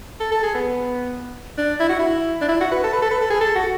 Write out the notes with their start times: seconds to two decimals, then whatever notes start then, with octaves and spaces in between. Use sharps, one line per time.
0.20 A4
0.32 A4
0.43 G#4
0.55 B3
1.58 D4
1.80 E4
1.90 F#4
1.99 E4
2.41 D4
2.49 E4
2.61 F#4
2.72 B4
2.84 A4
2.93 B4
3.02 A4
3.11 B4
3.21 A4
3.31 G#4
3.41 A4
3.56 F#4